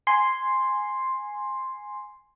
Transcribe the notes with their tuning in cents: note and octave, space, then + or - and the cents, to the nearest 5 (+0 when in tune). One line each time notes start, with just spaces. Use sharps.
G#5 +0 C6 +0